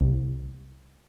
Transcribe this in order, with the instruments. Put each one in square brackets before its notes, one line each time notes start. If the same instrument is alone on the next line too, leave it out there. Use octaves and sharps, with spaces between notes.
[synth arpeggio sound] C2